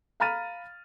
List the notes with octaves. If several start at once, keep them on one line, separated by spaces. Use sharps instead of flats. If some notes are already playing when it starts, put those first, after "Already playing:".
F5 A#5 B5 F6 A6 D#7